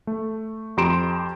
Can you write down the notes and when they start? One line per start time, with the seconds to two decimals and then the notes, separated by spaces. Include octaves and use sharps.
0.07 A3
0.77 F2 G4 A#5 C6 D7 E7